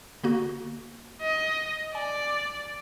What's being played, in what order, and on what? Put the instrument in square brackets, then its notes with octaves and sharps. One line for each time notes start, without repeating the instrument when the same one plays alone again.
[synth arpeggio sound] D3 A#3 F#4
[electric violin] D#5
[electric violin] D5 [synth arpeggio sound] G#5